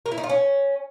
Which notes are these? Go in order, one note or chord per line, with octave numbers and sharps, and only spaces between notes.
A#4
E4
D#4
F4
C#4